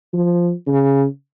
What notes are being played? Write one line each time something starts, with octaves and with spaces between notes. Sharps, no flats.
F3
C#3